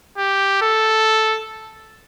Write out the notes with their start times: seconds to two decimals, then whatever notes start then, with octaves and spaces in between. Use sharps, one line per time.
0.18 G4
0.62 A4